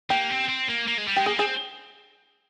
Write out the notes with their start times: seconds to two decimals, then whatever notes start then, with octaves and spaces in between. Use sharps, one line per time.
0.10 A#3 G4
0.30 C4
0.49 C4
0.69 A#3
0.87 A#3
0.98 G#3
1.07 G3
1.16 G#3 G4
1.26 A#3 G#4
1.39 C4 G#4